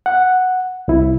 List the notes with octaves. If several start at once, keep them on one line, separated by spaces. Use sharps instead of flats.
F#5
C2 E4